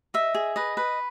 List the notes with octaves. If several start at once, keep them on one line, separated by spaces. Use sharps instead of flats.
D#5 E5
G#4
B4 D#5
B4